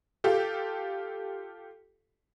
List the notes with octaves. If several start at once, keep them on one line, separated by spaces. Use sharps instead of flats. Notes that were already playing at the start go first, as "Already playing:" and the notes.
F4 G4 A4